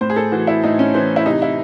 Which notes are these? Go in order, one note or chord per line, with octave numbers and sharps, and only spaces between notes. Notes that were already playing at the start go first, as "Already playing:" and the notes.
A2 C5
G#4
A4
E3 F#4
E4
A2 D#4
C#4
E3 C5
E4
C3 D#4
E4